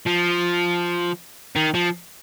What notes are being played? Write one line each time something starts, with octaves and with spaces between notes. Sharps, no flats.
F3
D#3
F3